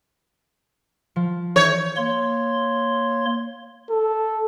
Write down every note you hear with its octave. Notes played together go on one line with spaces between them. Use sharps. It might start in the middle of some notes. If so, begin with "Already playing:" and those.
F3
E3 C#5 G6
A#3 C#5 C6
A4